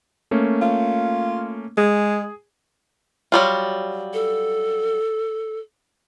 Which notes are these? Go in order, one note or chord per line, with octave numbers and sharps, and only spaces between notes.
A3 A#3 C#4
F4
G#3 G#4
F#3 G3 F4
A4